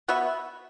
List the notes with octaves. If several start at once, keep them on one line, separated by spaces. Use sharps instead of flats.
B3 F#4 B4 E5